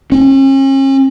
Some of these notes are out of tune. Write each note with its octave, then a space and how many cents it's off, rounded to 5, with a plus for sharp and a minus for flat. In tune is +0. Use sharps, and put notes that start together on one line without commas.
C#4 -40